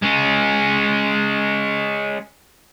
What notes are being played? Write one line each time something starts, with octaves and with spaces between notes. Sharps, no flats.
G#3 C#4